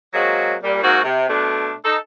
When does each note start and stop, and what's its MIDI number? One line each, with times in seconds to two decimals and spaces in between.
0.14 0.55 54
0.14 0.55 56
0.14 0.55 58
0.14 0.55 60
0.14 0.55 66
0.63 0.80 46
0.63 0.80 55
0.83 1.00 44
0.83 1.00 58
0.83 1.00 60
0.83 1.00 66
1.04 1.25 48
1.29 1.73 47
1.29 1.73 57
1.29 1.73 62
1.85 1.97 63
1.85 1.97 69